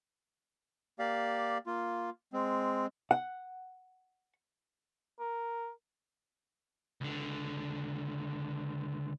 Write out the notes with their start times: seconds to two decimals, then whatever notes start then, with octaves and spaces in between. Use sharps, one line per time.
0.99 A#3 G4 D5 F5
1.66 A#3 F4
2.33 G#3 C4
3.11 F#5
5.20 A#4
7.01 C#2 D3